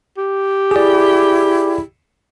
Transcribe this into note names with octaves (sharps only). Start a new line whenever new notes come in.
G4
E4 G#4 D5